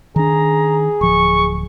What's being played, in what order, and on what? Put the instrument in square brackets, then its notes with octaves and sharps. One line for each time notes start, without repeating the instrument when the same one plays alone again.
[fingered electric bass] D#3 D4 [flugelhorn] G#4 [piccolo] A#5
[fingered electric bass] D1 F3 [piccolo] C#6